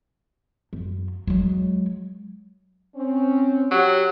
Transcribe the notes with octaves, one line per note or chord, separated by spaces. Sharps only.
F#2
F#3 G#3
C4 C#4
F#3 G4